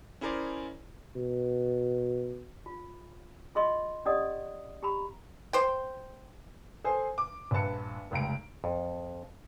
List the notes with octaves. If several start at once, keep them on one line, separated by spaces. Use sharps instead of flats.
C#4 E4 G#4 A#4 C5 D5
B2
F4
F4 G#4 D#5 E5 C6 C#6
C#4 G4 D5 D#5 F#5 D#6
G4 A#5 B5
C5 G5
G#4 A4 C5 G#5
D6
A#1 G2 B4 A5 C#7
F1 C#2 A#5 D7
F2